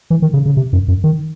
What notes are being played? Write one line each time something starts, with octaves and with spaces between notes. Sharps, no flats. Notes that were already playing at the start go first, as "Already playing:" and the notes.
E3
D#3
C#3
C#3
C3
F#2
F#2
D#3